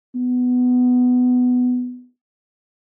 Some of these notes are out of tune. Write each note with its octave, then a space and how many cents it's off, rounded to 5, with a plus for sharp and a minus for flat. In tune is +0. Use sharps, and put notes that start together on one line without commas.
B3 +10